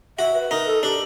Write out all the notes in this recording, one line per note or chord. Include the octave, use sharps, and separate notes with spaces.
F#4 E5
B4
D#4 A#4
A4
D4 G4